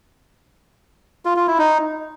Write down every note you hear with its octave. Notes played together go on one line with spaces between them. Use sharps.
F4
F4
E4
D#4